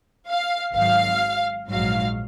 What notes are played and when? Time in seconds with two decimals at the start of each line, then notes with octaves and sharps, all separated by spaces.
0.28 F5
0.75 G#1 G#2 F#3 F5
1.69 A#1 G#2 F#3 F5